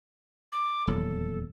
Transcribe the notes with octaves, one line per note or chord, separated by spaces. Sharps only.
D6
D#1 E2 F#3 A4